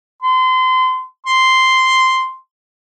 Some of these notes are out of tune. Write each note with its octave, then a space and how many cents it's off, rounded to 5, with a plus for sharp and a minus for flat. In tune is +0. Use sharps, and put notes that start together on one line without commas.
C6 -30
C6 -5